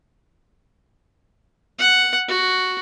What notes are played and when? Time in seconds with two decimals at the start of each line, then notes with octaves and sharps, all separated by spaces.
1.79 F#5
2.29 F#4